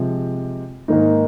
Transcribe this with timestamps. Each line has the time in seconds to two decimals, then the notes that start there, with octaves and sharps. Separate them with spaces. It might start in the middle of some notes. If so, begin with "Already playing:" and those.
Already playing: C3 F3 G#3
0.88 G#2 D#3 A#3 D#4